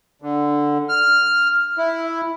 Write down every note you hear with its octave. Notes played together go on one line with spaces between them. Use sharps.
D3
F6
E4